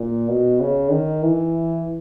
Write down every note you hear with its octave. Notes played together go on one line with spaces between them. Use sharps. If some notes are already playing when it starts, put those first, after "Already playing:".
Already playing: A#2
B2
C#3
D#3
E3